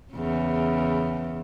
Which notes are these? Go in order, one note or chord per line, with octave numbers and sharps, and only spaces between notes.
E2 C#3